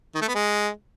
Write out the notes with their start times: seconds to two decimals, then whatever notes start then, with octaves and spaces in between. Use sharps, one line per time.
0.15 D#3
0.21 A3
0.28 B3
0.35 G#3